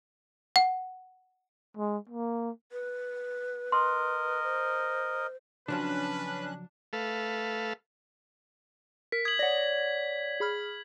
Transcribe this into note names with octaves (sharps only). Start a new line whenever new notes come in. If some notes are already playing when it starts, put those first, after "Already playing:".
F#5
G#3
A#3
B4
A#4 D#5 C6
C5
C#3 F3 F#3 C#4 D4 B4 F#6
A3 A4 B4 F5
A#4 B6
D#6 G#6 F#7
C#5 D5 F#5 A#6
G#4 B5 F6